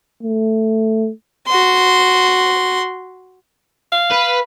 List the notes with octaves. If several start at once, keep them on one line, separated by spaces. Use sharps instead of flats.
A3
F#4 C6
F5
B4